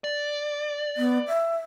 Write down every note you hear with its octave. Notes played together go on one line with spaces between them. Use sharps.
D5
B3
E5